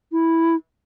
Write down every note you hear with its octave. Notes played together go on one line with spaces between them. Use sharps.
E4